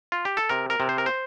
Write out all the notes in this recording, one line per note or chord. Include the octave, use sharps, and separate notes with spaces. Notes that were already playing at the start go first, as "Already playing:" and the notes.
F4
G4
A4
C3 A#4
A#4
C3
C5
A#4
C5